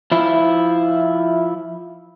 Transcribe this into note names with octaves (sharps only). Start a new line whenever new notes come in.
F3 E4